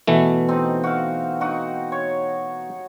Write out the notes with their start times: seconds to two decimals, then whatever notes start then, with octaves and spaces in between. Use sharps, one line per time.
0.07 B2 E3 A3
0.48 C4 D#4
0.84 F#4 F5
1.41 D#4 F#4
1.92 C#5